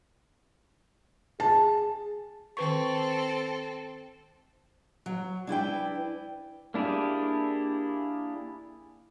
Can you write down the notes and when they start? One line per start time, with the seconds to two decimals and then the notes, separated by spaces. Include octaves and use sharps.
1.40 G#4 A5
2.57 D#3 C4 A4 B4 C#6
5.06 F#3
5.47 D4 E4 B4 G5
6.74 A#3 D4 E4 G4 G#4